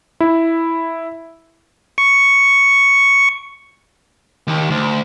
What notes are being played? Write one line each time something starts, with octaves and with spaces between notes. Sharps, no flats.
E4
C#6
D#2
D2